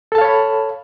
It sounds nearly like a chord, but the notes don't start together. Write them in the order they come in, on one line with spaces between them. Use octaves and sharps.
A4 A5 F5 C#5 B5